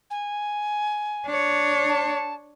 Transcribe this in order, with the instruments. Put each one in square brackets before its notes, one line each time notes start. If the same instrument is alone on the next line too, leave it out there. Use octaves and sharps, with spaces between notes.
[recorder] G#5
[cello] D4 C#5
[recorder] A5